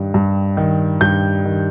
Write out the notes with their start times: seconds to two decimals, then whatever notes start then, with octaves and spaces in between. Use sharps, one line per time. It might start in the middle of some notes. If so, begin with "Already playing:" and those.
Already playing: G2 D#3
0.14 G2
0.57 D#3
1.01 G2 G6
1.45 D#3